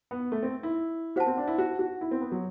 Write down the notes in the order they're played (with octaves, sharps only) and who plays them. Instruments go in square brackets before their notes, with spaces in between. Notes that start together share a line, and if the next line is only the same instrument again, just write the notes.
[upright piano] B3
A3
C4
E4
[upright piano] F#4 [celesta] C5 F#5 A5
[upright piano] C4
D4
E4
F#4
F#4
E4
C4
B3
F#3